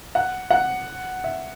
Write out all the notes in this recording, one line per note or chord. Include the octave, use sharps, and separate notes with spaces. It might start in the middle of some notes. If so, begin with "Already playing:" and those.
F#5
F#5
E5